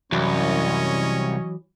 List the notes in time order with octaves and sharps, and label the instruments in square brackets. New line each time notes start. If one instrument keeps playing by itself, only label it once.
[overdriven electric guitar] C2 [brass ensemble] F#2 [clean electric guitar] E3 F#3 [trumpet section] C#4 C#5 D#5